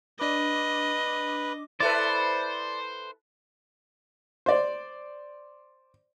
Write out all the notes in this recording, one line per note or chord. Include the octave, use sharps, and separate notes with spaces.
D4 B4 D#5 D6
E4 A4 B4 C5 D5
C5 D5